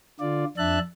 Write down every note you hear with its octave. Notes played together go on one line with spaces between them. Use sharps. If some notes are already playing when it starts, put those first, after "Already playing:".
D3 F4 D5
F2 D4 E5 A5 F#6